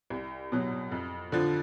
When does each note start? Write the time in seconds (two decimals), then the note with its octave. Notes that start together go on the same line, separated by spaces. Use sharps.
0.10 C2
0.52 B2 F#3
0.92 F2
1.32 D3 F3